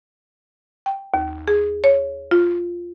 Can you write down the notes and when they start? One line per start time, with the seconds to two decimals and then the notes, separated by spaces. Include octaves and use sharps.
0.86 G5
1.14 D#2
1.48 G#4
1.84 C#5
2.31 F4